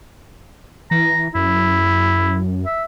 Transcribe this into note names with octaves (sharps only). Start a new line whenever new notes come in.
E3 A#5
F#2 E4
E5